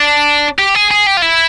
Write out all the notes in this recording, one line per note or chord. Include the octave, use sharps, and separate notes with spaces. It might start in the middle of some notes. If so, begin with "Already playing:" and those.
Already playing: D4
G4
G#4
G#4
G4
F4
E4